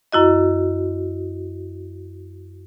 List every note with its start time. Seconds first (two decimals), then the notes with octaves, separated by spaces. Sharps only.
0.12 F#2 E4 F#4 D#5